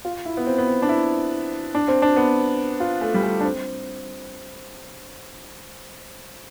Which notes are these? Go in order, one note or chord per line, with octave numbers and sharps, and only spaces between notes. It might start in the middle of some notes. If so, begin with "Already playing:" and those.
F4
E4
B3
C4
B3
C4
D4
E4
D4
C4
D4
B3
F4
A3
G3
A3
D4
C4